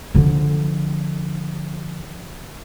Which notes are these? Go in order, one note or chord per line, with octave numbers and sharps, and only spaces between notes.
D3 F3